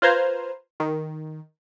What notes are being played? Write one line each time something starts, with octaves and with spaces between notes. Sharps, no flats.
F4 B4 C5 A#5 G#6 C7
D#3